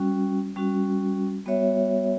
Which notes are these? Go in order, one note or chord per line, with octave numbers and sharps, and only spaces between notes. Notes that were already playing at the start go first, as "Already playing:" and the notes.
Already playing: G3 C#4 F#4
G3 C#4 F#4
G3 B3 F#4 C#5 E5